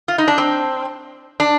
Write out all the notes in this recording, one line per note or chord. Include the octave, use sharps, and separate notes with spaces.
F4
D#4
D4
C4
D4